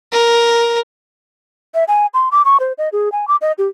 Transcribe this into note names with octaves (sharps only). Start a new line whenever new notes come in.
A#4
E5
G#5
C6
D6
C#6
C5
D#5
G#4
G#5
D6
D#5
G4